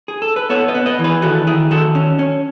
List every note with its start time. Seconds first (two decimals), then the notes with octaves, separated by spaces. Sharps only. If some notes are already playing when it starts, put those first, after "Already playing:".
0.08 G#4
0.22 A4
0.36 B4
0.50 B3 A4 C#5
0.68 B4 D#5
0.75 B3
0.86 B4 D#5
0.99 E3
1.04 G#4 B4
1.22 D#3 F#4 A4
1.47 D#3 E4 G#4
1.71 D#3 F#4 A4
1.95 C#4
2.19 C#4